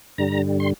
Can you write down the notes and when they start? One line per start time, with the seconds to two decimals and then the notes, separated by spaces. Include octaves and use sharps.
0.18 G2 D3 G3 A#5
0.60 C6